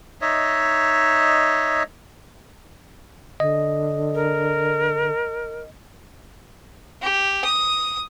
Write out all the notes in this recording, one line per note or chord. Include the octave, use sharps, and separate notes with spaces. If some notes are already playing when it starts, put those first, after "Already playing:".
D#4 C#5 D#5 E5
D3 D#5
A#4
G4
D#6